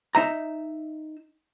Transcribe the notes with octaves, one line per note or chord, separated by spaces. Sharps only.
D#4 E5 A#5